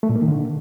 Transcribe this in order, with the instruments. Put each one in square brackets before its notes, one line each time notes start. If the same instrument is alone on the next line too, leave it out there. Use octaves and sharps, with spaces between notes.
[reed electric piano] A3
A#2
A#3
D#3
D3